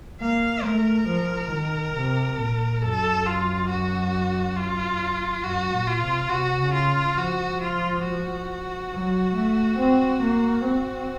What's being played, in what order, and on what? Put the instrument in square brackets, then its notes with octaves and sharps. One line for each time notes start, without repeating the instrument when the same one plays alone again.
[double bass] A#3 [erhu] F5
[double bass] A3 [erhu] A#4
[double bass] F3
D#3
C3
A#2
[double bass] F#2 [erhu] A4
[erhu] F4
F#4
F4
[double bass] F#2 [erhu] F#4
[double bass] A#2
[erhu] F4
[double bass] C3
[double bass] C3 [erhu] F#4
[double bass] C#3
[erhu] F4
[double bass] F3 [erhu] F#4
[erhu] F4
F#4
[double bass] F#3
A3
C4
A#3
C4